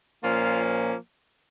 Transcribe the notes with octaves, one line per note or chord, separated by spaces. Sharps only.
A#2 F3 A#3 C#4 F4